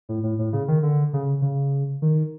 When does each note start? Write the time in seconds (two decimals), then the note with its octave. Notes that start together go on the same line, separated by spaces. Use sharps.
0.09 A2
0.23 A2
0.39 A2
0.53 C#3
0.68 D#3
0.83 D3
1.13 C#3
1.42 C#3
2.02 D#3